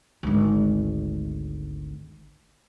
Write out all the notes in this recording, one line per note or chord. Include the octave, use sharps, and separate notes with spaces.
G#1 D2